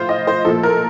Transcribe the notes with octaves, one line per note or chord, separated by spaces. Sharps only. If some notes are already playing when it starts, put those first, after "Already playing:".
Already playing: A2 F3 F4 C5
D#5
C5
A#2 F3 A4
A#4